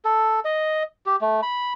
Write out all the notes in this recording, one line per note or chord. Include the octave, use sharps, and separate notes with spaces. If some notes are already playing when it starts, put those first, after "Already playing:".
A4
D#5
G4
A3
B5